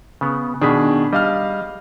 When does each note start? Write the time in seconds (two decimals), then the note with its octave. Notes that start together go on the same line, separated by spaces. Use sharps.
0.21 C#3 B3
0.62 B2 D#3 D4 G#4 B6
1.13 G3 D#5 F5 F6